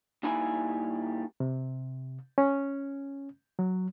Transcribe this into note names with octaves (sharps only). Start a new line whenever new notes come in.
A#2 G3 D#4 E4 G#5 B5
C3
C#4
F#3